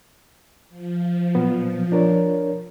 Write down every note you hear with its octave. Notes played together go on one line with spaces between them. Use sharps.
F3
A#2 F#3 B3
D4 A#4 C#5